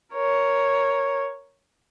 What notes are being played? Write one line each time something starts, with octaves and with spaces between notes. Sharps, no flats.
A#4 C#5